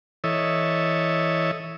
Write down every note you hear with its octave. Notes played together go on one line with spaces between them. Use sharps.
E3 A4 C#5 D#5 E5